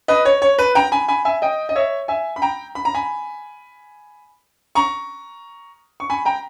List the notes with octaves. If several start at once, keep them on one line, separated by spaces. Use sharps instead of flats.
B4 D#5
C#5
C#5
B4
G5 A#5
G#5 B5
G#5 B5
E5 G#5
D#5 G5
D#5
C#5 E5
E5 G#5
B5
G5 A#5
B5
A#5
G#5 B5
A#5 C#6
C#6
G#5 B5
G5 A#5